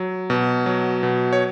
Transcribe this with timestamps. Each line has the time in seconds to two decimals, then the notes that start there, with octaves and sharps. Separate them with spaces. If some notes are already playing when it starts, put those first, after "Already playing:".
Already playing: F#3
0.30 B2
0.66 F#3
1.03 B2
1.33 C#5